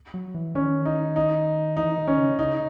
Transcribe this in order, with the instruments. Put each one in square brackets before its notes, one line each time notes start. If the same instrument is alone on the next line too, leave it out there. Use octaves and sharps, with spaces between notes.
[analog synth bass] F#3
E3
[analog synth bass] D#3 [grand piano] C#4
[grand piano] D#4
D#4
[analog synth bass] E3 [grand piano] D#4
[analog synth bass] D#3
[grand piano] C#4
[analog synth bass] C#3
[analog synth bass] C#3 [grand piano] D#4